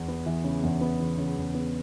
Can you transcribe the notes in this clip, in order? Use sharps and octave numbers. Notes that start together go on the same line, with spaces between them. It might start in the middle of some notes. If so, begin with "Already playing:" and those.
Already playing: E2
B3
E3
C#3
E2
B3
E3
C#3
E2
B3